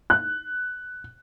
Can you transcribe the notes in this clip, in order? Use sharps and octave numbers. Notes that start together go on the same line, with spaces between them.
F#6